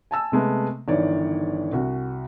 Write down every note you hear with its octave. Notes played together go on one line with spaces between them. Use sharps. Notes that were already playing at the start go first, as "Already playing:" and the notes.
G#5 A5 E6
C3 G#3 A3 B3
G1 D#3 E3 C#5 D5
C2 F#4